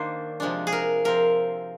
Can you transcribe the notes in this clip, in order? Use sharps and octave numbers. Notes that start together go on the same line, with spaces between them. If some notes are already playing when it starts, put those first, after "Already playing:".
Already playing: D#3 A#3 D4 C5
C3 F3 G#3 D4
G#4
A#4
C3 F3 C4 A#4